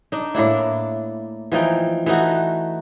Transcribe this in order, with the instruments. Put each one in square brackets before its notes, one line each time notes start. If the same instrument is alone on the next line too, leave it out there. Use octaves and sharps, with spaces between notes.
[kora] D4 D#4
A2 A#3 D4 E4
E3 F3 D#4 G5
E3 A3 D#4 F#4